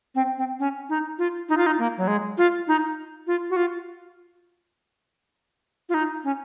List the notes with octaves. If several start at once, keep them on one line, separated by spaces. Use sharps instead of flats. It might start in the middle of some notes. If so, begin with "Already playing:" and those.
C4
C4
C#4
D#4
F4
D#4
F4
D#4
A#3
F#3
G#3
F4
D#4
F4
F#4
F4
F4
D#4
C#4